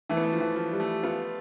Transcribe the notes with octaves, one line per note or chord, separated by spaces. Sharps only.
E3 A3
B3
A3
F3
E3
F3
G3
A3
B3 F4